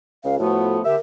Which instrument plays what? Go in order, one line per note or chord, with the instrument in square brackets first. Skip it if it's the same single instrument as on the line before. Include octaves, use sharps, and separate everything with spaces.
[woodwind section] C#2 C#3 [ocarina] F5
[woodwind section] A2 F3 [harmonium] A3 B3 [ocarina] F#4
[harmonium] D3 G4 [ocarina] A#4 [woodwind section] E5